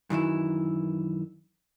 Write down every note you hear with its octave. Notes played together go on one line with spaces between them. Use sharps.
F#2 D#3 E3 E4